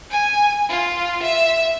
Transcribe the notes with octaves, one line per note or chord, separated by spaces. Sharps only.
G#5
F4
E5